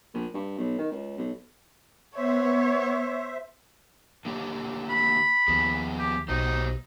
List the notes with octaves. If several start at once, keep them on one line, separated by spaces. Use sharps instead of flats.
A#1
G2
B1
D#3
C#2
B1
B3 C5 C#5 E5
D3 A#3 G4
B5
D#2 F3 B3 G#4
G4
B1 D#4 F#4 G4 C5